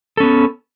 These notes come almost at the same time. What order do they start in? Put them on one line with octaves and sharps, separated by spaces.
A4 C#4 B3